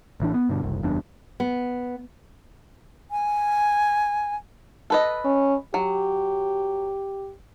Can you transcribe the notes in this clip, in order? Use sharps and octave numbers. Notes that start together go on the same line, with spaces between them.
A1 E3 D4
B3
G2 B2 D3
F#1 C2
F#1 E2 G3 D4
B3
G#5
A4 B4 D#5
C#4
F#3 G4